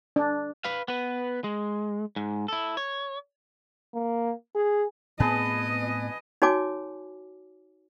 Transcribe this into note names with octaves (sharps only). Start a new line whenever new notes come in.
D4
B4 F5
B3 B4
G#3
G#2
E4 A4
C#5
A#3
G#4
A2 B3 C4 G#4 B4 D#5 A5
D#4 F#4 C#5 G#5 D6